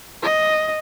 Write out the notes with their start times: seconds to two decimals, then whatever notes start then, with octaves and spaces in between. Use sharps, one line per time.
0.23 D#5